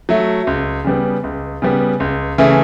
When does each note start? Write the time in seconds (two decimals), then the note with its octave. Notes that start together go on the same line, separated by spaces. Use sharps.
0.09 F#3 A3
0.47 C#2
0.84 C#3 G3 B3
1.24 C#2
1.62 C#3 G3 B3
2.00 C#2
2.38 C#3 E3 A3